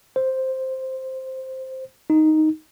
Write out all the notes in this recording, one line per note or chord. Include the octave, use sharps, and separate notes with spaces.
C5
D#4